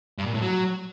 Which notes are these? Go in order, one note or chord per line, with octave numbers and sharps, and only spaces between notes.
G2
A#2
A2
F#3